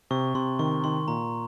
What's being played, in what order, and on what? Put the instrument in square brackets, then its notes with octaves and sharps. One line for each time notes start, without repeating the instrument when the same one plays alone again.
[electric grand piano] C3 [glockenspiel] C#6
[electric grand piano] C3 [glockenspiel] C6
[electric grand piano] D#3 [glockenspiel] C#6
[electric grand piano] D#3 [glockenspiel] C6
[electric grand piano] A#2 [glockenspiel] A#5